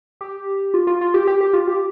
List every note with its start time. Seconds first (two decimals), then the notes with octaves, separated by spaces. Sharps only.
0.21 G4
0.74 F4
0.87 F4
1.01 F4
1.14 G4
1.27 G4
1.41 G4
1.53 F4
1.68 G4